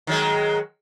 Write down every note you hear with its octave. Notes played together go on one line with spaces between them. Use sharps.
D#3 F#3 G#3